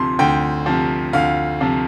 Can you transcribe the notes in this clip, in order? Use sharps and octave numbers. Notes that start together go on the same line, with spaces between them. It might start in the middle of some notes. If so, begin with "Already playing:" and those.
Already playing: D2 C3 F3 C6
D2 G5
C3 F3
D2 F5
C3 F3